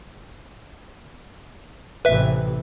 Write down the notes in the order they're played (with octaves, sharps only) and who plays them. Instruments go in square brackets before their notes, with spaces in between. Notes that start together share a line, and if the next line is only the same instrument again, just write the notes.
[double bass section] A1 C3 E3 [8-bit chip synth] B4 E5